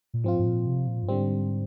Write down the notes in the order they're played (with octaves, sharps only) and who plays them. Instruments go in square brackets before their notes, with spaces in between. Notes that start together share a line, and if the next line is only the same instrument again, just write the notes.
[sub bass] A#2
[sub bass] G#2 [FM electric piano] F3 C4 F4
[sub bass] G#2
A#2
C3
A#2
G2
[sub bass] G#2 [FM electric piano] D3 G3 C4